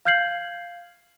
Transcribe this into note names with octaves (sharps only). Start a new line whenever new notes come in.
F5 F6 G6 G#6 C7 F#7